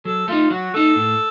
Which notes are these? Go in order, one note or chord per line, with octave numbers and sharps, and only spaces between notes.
F#3 A4
A3 D#4 F4
F#3 F#4
A3 D#4 A4
A2